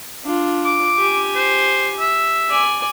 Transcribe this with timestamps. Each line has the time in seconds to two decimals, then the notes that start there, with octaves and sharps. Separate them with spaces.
0.24 D4 F4
0.65 D6
0.98 G4 G#5
1.36 C5
1.99 E5
2.50 D5 G#5